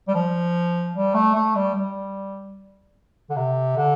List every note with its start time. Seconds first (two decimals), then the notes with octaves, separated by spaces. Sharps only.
0.08 G3
0.14 F3
0.95 G3
1.14 A3
1.35 A3
1.55 G3
1.75 G3
3.30 D3
3.36 C3
3.76 D3